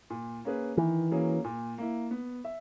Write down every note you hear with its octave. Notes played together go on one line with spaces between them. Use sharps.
A#2
A#3 C#4 G#4 B4
D#3 E3
F#3 A#3 C#4 G#4
A#2
A#3 E4
B3
E5